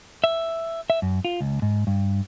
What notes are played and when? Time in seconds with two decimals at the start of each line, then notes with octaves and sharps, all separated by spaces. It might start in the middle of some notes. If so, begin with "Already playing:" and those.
0.24 E5
0.90 E5
1.02 F#2
1.25 F4
1.41 C#2
1.62 G#2
1.87 G2